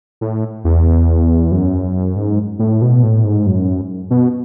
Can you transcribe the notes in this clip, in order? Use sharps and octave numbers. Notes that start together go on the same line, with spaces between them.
A2
E2
F#2
G#2
A2
B2
A2
G#2
F#2
B2